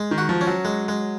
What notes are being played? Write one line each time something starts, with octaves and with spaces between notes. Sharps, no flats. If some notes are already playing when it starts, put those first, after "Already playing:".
Already playing: G#3
D#3
F#4
F3
C#4
F#3
G#3
G#3